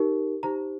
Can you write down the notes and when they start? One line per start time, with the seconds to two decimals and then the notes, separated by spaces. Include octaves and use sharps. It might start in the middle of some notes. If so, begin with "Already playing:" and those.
Already playing: D#4 G4 A#4
0.43 D#4 G4 C5 A#5